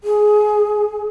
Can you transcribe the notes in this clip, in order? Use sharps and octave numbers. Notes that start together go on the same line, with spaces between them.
G#4